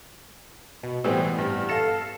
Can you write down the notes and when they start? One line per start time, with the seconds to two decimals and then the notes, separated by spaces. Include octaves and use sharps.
0.83 B2
1.04 A2 E3 G3 B3 C4
1.38 G2
1.69 A4 F5 A#6 E7